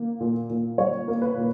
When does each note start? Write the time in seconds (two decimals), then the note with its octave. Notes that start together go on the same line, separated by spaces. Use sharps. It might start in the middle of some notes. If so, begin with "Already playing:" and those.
Already playing: A#3
0.20 A#2
0.50 A#2
0.78 G3 C#5
1.08 A#3
1.22 B4
1.37 A#2